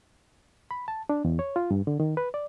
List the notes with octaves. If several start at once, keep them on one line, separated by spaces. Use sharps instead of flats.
B5
A5
D4
E2
C#5
F4
G2
D3
D#3
B4
D5